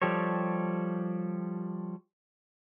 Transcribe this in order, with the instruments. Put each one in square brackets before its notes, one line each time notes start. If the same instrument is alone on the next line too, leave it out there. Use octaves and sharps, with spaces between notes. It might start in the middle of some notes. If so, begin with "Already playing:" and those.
[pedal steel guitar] F3 G3 G4 A4 C#5